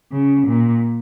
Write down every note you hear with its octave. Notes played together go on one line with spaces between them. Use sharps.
C#3
A#2